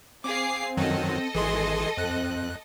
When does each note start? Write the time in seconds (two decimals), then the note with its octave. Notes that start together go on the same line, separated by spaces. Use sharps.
0.24 C4 G#4 F5 D6 C7
0.77 F#2 D#3 F#3 A4 D#5
1.35 G#1 E3 G#4 C6
1.97 F2 C4 F#6